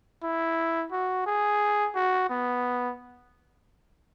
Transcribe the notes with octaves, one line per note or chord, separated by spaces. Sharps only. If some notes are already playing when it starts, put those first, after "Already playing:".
E4
F#4
G#4
F#4
B3